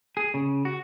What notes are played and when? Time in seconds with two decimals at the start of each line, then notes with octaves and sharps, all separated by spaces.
0.17 G#4
0.34 C#3
0.65 F#4